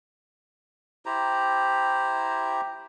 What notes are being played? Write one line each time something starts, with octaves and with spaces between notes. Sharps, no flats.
E4 G4 C5 A#5